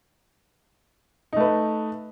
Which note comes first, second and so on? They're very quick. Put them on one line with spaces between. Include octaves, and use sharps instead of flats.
D#4 A3 B4